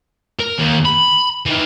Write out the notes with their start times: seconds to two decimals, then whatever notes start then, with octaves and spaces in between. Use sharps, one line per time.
0.39 A#4
0.58 D#2
0.85 B5
1.46 D#3 E3